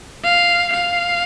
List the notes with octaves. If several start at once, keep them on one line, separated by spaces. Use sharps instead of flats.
F5
F5